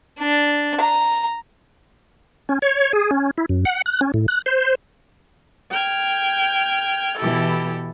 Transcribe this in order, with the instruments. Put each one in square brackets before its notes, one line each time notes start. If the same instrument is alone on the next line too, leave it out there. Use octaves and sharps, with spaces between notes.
[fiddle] D4
A#5
[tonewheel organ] C#4
C#5
G#4
C#4
E4
F#2
F#5
F#6
C#4
A2
F#6
C5
[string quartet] G5 F6 G#6
B2 E3 E4 G4 A4